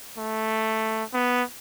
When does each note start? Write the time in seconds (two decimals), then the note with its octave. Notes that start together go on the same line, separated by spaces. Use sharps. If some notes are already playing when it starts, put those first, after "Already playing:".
0.18 A3
1.14 B3